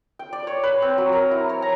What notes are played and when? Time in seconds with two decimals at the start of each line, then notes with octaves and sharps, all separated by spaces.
0.19 G5
0.33 D5
0.47 C#5
0.63 B4
0.82 C4
0.98 F#3
1.13 A#4
1.31 E4
1.49 C#5
1.62 A#5